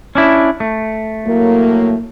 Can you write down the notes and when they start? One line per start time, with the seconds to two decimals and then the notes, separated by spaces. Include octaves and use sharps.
0.15 C#4 D4 E4
0.60 A3
1.25 A2 F#3 A#3